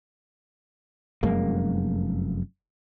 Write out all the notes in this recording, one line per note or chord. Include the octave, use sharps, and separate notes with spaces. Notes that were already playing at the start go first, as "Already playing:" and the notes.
F1 F#2 G#3 A#3